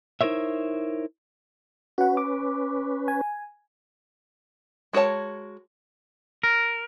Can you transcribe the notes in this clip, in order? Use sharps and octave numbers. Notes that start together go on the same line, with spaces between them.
D#4 E4 A#4 C5 C#5 E5
C#4 F#4 B4 F#5
D6
G#5
G#3 F#4 A#4 C#5 A5
A#4